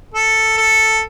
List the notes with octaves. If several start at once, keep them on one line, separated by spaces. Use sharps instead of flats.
A4
A4